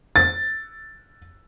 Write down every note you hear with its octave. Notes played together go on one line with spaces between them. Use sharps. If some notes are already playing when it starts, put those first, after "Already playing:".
A6